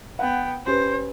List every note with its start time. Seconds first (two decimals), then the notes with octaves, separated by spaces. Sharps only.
0.19 B3 F#5 G5
0.66 C#4 G4 B4 C5